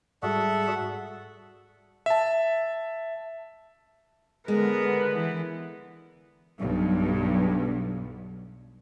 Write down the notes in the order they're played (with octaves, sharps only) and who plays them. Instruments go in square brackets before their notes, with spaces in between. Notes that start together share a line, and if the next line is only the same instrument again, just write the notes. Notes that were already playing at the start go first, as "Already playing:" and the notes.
[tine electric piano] G#2 [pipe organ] G3 F#4 G#4 [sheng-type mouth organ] A4 E5 F#5
[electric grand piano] E5 A5
[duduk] D3 [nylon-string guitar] G#3 [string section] B3 [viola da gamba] A#4
[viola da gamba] E3
[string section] B1 G2